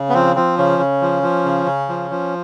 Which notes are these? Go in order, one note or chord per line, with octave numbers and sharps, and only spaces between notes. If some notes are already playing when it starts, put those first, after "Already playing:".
Already playing: C#3
B3
F3 C4
F3 C4
C#3 C#4
C#3
F3
F3
C#3
C#3
F3
F3